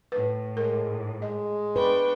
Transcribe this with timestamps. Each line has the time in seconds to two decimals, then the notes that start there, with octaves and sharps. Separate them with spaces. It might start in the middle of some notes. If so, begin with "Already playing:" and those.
0.12 A2 B4
0.57 G#3 A#4
1.22 G#3 D#5
1.76 D4 B4 G5 C#6